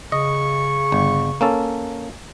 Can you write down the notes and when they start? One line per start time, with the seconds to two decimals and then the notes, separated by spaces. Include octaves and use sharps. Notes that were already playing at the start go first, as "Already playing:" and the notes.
0.12 C#3 D#5 C#6
0.92 G1
1.41 A#3 C#4 A4